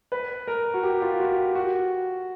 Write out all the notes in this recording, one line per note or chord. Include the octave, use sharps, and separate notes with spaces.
B4
A#4
F#4
G4
F4
F#4
G4
F#4